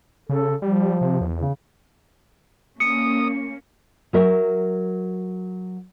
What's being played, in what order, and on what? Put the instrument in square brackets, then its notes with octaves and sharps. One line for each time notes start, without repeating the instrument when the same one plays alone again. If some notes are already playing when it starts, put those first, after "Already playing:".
[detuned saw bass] C#3 [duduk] A4
[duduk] F3 [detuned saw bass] G3
[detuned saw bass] C3
E2
[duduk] C#3
[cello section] A#3 C#4 [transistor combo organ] D#6 [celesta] C#7
[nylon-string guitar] F#3 A#4 E5